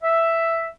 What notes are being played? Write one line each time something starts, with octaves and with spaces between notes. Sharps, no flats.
E5